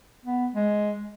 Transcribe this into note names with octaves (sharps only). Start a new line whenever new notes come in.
B3
G#3